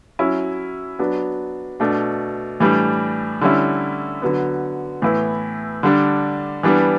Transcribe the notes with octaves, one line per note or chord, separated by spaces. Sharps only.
F#3 C#4 E4
F#3 B3 D4
B2 A3 D4
A2 E3 G3 D4
D3 G3 C#4 E4
D3 F#3 B3
A2 E3 B3 E4
D3 G3 D4
E3 G3 B3 D4